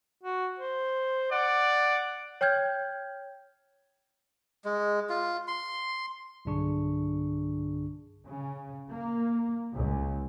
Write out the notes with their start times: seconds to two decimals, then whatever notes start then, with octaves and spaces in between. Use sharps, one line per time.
0.23 F#4
0.59 C5
1.31 D5 F#5
2.41 C#5 G5 F6 G6 G#6
4.65 G#3
5.09 F4
5.48 C6
6.45 B1 G2 D3 D4 G#4 C#6
8.26 C#3
8.91 A#3
9.74 C#2